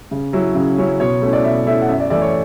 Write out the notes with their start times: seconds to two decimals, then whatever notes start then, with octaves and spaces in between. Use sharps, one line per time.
0.11 C#3
0.33 F#3 C#4 E4
0.55 C#3
0.78 F#3 C#4 E4
1.00 B2 C#5
1.22 A3 C#4 E4
1.33 D5
1.44 B2 E5
1.66 A3 C#4 E4 E5
1.82 F#5
1.88 F#2 E5
2.00 D5
2.10 E3 A3 D5
2.21 C#5